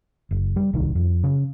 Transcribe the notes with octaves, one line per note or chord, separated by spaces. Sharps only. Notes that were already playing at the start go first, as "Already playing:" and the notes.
F#1
G3
D1 C2 D#3
F2
C#3